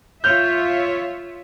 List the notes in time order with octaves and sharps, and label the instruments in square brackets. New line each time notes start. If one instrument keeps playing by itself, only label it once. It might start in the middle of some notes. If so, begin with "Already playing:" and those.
[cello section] F4 C#5 E5 [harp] F6 G6